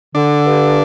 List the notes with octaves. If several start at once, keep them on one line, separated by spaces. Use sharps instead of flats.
D3 D4
G2